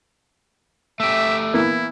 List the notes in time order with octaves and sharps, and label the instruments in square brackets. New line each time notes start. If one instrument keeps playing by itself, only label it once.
[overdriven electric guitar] A3 G4 [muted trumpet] E5
[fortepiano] E3 A#3 B3 [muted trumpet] E4